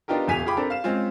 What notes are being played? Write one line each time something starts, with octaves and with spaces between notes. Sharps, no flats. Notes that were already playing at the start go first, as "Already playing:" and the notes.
B3 D4 D#4 F4 G4 A#4
D#1 E2 G#5 B6 D#7 F7
F4 G#4 G5 B5 D6
C4 D4 A4 A#4
F5 E7
G#3 C4 C#4 F4